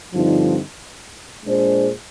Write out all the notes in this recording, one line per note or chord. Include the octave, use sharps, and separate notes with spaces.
G2 D3 F3 C4 D#4
A#2 G#3 D4 G#4 C5